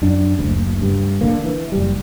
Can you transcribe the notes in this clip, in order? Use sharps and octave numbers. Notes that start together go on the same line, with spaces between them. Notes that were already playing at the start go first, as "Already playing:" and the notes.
F#2 D4
F#1 D2
G2
D3 A#3
E3
F#1 G3